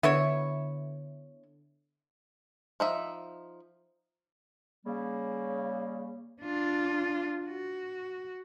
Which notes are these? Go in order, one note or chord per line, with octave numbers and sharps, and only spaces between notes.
D3 B3 E4 C#5 E5
F3 D#4 E5
C#3 G3 A#3
D4 F4
F#4